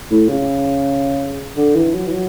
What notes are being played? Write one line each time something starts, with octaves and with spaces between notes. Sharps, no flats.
A2
C#3
D3
E3
F#3
E3
F#3